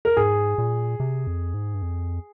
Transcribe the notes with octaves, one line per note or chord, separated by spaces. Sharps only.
A#4
G#2 G#4
A#2
C3
F2
G#2
G2
F2